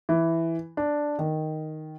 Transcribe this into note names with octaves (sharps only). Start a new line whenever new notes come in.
E3
D4
D#3